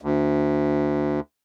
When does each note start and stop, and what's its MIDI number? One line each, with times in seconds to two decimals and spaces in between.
0.01 1.20 38